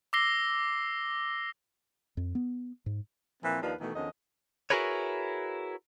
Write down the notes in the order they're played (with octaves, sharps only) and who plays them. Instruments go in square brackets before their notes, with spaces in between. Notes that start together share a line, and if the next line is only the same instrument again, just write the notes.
[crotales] D6 E6 A#6 C7 G7
[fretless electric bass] F2
B3
G#2
[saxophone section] A#2 E3 F3 C4
D#2 F3 D4 D#4 B4 F5
B2 D#3 E3 A3
E2 D3 D#3 F3 C#4 D#5
[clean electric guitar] E4 F#4 G#4 A#4 B4 C#5